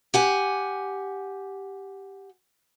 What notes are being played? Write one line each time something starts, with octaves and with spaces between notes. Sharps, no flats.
G4 F#5 G#5